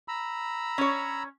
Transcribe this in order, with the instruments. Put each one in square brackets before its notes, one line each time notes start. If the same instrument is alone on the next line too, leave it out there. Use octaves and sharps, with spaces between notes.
[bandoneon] A#5 B5 E6
[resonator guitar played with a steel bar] C#4 C#5